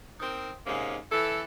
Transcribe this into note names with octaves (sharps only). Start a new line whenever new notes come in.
C4 D#4 A#4 C5
G#2 C3 A#3 C#4 D#4
E3 E4 A4